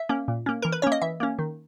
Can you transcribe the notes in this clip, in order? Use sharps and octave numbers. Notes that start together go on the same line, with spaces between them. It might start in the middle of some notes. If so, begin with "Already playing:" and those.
Already playing: E5
A#3 C#4
A#2
A#3 C#4
E3 A#4
B4
A#3 C#4 C#5
D#5
E3 E5
A#3 C#4
D#3